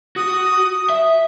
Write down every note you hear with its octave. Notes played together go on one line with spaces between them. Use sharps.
F#4 D#6
E5